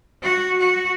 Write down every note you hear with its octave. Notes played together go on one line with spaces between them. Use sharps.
F#4
F#4